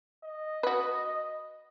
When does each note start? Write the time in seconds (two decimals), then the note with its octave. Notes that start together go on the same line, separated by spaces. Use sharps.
0.24 D#5
0.63 F#4 B4